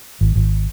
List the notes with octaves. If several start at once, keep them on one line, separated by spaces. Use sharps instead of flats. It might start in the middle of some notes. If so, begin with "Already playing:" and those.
G#1
G#1